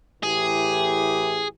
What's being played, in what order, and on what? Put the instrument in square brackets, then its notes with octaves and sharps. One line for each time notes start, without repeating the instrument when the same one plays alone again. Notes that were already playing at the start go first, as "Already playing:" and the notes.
[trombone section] A2 E3 G4 [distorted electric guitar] G#4